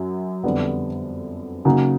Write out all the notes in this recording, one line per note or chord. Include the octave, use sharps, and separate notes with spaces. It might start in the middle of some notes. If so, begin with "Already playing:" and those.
Already playing: F#2 F#3
F2 D3 G3 B3
C#3 F#3 A#3 D#4 F#4